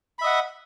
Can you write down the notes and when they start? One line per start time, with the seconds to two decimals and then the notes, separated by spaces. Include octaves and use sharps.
0.19 B5
0.21 E5
0.24 D#5
0.26 F#5